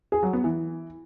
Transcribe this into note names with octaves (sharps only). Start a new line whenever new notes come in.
G#4
F#3
B3
E3